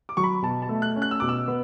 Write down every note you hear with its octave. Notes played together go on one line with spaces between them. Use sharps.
D6
F#3 C#6
B5
B2 A5
A5
A3
F#6
C#4
F#6
E6
B2 D6
E6
B3